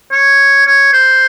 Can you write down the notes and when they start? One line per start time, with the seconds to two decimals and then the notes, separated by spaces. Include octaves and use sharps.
0.12 C#5
0.67 C#5
0.93 C5